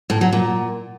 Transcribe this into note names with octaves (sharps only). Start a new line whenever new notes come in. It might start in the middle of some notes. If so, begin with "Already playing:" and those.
A2
F#3
A#2